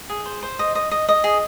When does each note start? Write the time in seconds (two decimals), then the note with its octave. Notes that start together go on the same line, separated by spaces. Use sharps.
0.09 G#4
0.26 C5
0.43 C5
0.59 D#5
0.75 D#5
0.91 D#5
1.09 D#5
1.24 G#4